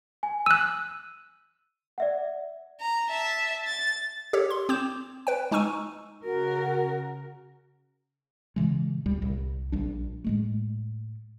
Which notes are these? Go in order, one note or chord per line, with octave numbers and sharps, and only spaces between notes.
G#5
E6 F#6 D#7
D5 E5 F#5
A#5
E5 A5
A6
G4 A4 C#5
C6
C4 D6 G6 E7
B4 G5
G#3 D#4 G#5 C#6 E6 D#7
C#3 F#4 A#4
A#2 C#3 E3 G#3
D2 A#2 G3
C2
A#1 G3 D4
A2 G#3 A3